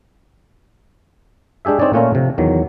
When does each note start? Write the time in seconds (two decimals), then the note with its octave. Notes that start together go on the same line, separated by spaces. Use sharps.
1.65 G#3 D4 G4 G#4 E5
1.79 C4 D#4 C#5 D5 G#5
1.93 A#2 A3 C#4 F4 A#4
2.15 C3 F3
2.38 E2 D#3 F#3